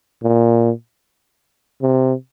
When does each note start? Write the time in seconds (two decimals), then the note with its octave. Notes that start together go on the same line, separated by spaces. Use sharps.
0.23 A#2
1.82 C3